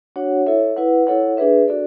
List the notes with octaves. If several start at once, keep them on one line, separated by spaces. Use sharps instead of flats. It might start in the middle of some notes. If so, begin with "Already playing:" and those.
D4 F#4 C#5 F#5
E4 A4 C#5 E5
E4 B4 F#5
E4 A4 C#5 F#5
D4 G#4 B4 E5
D4 F#4 A4 D5